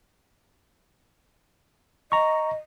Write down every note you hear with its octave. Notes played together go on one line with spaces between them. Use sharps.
D#5 A#5 C#6